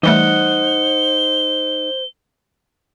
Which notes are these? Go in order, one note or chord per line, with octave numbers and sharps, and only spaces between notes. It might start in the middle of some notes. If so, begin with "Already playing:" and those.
E3 G3 A3 D#4 C5 F#5 G7